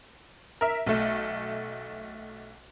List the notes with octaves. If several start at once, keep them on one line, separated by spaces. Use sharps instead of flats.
A#4 E5
B1 A3